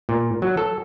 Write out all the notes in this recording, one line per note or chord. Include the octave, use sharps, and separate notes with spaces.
A#2
F#3
A4